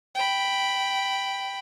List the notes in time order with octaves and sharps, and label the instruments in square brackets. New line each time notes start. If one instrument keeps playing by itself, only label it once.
[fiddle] G5 B5